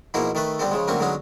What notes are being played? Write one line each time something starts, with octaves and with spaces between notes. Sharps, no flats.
B2 F3 A#3 D#4 E4 G#4
D#3 A3 A4 B4
D3 G3 B3 C4 A4
C#3 F3 G#3
D2 F#3 A#3 C4 C#4 C#6
D3 F#3 G#3 B3 C#4 D#4